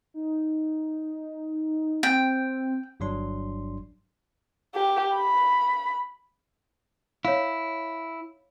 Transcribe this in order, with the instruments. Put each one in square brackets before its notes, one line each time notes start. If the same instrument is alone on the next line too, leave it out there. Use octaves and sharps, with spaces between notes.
[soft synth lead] D#4
[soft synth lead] C4 [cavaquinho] G5
[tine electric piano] G1 G2 F#3 D4 C6
[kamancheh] G4
B5
[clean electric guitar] E4 [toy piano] C#5 F5